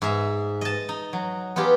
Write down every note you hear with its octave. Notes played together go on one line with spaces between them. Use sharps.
G#2 G#4 E5
D#5 A5
D#4
F#3
B3 D#4 F4 G4 G#4